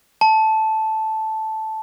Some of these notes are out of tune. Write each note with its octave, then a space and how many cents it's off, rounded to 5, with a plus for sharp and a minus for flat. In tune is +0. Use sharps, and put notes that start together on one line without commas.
A5 -5